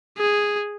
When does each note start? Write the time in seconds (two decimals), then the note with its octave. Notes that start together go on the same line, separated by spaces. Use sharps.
0.18 G#4